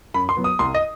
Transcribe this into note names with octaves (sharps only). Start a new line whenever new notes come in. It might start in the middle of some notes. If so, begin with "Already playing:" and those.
F#2 B5
C6
F#3 B3
D#6
C2 C6
D#5